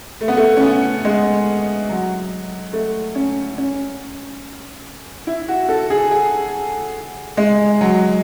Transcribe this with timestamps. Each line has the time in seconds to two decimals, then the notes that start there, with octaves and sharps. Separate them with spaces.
0.21 A3
0.28 B3
0.37 A3
0.57 C#4
0.62 B3
1.05 G#3
1.89 F#3
2.73 A3
3.15 C#4
3.58 C#4
5.27 E4
5.48 F#4
5.69 A4
5.90 G#4
6.11 G#4
7.37 G#3
7.81 F#3